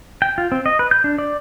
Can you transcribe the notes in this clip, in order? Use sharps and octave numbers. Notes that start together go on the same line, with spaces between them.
G5
F4
C4
D#5
B4
G6
D4
D5